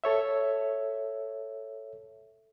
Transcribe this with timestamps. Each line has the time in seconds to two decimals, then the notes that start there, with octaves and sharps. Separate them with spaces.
0.04 A4 C#5 E5